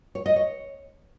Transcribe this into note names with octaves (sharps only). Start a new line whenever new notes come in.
C#5
D#5
C#5